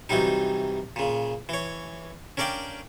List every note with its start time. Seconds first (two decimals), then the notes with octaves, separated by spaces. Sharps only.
0.09 C2 E3 F#3 G3 D#4
0.96 A#2 C#3
1.49 E3 C#5
2.37 C#4 D4 A#4 D5 F5 G5